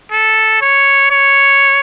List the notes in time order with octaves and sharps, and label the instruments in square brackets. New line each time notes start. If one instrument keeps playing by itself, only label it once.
[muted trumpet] A4
C#5
C#5